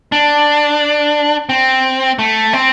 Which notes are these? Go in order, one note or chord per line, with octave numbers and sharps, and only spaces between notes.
D4
C4
A3
C4